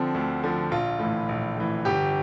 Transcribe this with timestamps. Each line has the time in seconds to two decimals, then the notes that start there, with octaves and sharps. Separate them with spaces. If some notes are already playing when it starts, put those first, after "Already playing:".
Already playing: D3 F3 C4
0.14 D2
0.44 D3 F3
0.71 A#1 F4
0.99 A2 E3
1.29 A#1
1.56 A2 E3
1.85 G1 G4